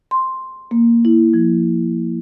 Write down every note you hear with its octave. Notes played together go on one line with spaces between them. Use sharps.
C6
A#3
E4
F3